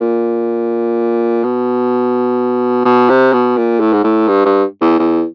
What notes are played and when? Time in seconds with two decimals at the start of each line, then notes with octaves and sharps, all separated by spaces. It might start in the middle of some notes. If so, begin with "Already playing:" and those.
0.01 A#2
1.44 B2
2.85 B2
3.09 C3
3.33 B2
3.57 A#2
3.80 A2
3.93 G#2
4.04 A2
4.28 G2
4.45 G2
4.81 E2
4.99 E2